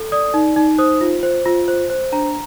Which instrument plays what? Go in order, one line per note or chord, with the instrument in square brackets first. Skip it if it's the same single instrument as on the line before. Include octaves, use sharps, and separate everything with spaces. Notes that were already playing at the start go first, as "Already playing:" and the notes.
Already playing: [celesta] A4
D5 D#6
D#4
D#4
C5 D#6
F4
C5
F4
C5
C5
D4 A#5